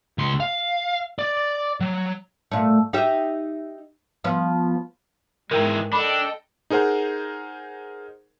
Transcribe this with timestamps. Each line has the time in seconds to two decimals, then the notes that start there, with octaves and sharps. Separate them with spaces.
0.18 C#2 C6
0.40 F5
1.19 D5
1.81 F#3
2.51 A#2 A3
2.93 D#4 G4 E5
4.24 F3 B3
5.51 G#2 E3 G#3 A#4 G5 A#5
5.93 D4 A4 D#5 G5 B5
6.70 D#4 G#4 A#4 C5 F#5 A#5